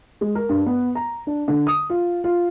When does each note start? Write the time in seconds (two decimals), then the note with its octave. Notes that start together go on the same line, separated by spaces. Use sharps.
0.21 G#3
0.35 A#4
0.49 G2
0.66 B3
0.95 A#5
1.27 D4
1.48 D3
1.67 D#6
1.90 F4
2.24 F4